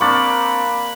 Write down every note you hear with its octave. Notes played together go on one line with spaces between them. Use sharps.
A#3 C4 D4 B5 C#6 A6